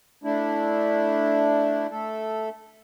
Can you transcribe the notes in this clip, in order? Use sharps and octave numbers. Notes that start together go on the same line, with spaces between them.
A3 D4 E4
A3 A4